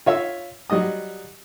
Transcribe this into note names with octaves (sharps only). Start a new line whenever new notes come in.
F4 C#5 E5 E6
F#3 G3 D#5 D#6